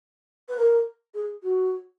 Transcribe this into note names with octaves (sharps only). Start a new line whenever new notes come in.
B4
A#4
G#4
F#4